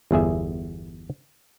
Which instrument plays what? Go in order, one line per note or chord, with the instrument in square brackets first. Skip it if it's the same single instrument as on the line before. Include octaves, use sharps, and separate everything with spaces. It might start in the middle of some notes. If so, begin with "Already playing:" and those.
[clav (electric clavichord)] G1 E2 G#4 E5